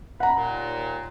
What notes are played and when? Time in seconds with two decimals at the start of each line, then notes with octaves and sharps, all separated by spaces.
0.20 F#5 A#5 B5
0.36 D#2 A#2